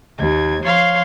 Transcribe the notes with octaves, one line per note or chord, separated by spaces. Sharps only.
D#2 G#6
F3 C#5 F5 C6